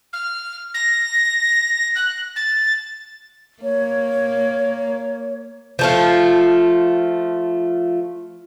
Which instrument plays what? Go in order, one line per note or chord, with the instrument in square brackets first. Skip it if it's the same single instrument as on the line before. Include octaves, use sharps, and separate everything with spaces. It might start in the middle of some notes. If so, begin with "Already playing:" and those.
[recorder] F6
A#6
F#6
A6
[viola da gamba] A#3 [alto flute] C#5
[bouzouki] F3 A3 F4